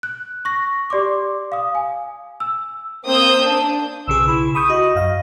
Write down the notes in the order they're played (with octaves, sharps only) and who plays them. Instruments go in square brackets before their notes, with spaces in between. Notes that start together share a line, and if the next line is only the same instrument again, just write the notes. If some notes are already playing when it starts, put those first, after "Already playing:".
[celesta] F#6
C#6 A#6
G4 D5 C6 D6
F5 D#6
G#5
E6
[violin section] A#3 C4 C5 D#6 E6 G6
D4
[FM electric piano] B1 C#3 G#4 [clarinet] E6
[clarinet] E4
[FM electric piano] B5 C#6 G6 [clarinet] D#6
[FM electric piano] F#4 [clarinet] D#5
[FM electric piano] F#2 F5